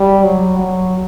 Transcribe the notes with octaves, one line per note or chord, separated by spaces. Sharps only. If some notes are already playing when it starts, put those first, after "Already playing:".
Already playing: G3
F#3
F#3